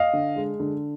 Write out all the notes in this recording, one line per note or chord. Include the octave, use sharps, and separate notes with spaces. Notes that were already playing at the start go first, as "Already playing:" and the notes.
Already playing: D#5 F5
D3
G#3
D3